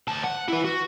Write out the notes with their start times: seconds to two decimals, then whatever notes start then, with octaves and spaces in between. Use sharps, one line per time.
0.08 D2 A5
0.24 F#5
0.48 E4 B4
0.65 F#4